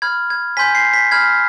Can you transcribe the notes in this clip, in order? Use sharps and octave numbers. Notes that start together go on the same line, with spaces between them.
B5 F6 G#6
G#6
G#5 C6 G6 B6
C7
B6
B5 F6 G#6